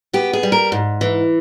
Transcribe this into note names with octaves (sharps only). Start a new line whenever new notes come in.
B3 G4
G#4
G3
A#4
G#2
E3